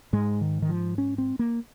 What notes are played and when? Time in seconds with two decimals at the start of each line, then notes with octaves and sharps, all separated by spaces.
0.13 G#2 G#3
0.41 D#3
0.62 D#3
0.69 F3
0.98 C#4
1.18 C4
1.39 A#3